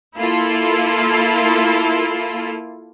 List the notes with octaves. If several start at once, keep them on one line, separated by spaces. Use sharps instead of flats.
A#3 E4 F4 A4